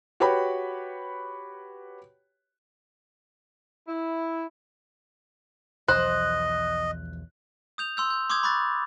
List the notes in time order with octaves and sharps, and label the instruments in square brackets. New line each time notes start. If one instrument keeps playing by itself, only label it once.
[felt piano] F#4 G4 B4 C#5 G5 B5
[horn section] E4
[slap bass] B1 E2 F3 [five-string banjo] C5 [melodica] D#5 [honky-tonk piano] F#6
[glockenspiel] D#6 G6 F7
C6 E6 G6
G6
C6 D6 D#6 G6 G#6
B5 C#6 D6 F#6 A6